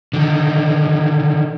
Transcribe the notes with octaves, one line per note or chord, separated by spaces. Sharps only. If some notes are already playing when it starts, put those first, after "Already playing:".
D3 D#3